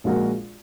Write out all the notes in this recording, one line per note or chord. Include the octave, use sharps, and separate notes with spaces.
A#1 A#2 G#3 F#4 A#4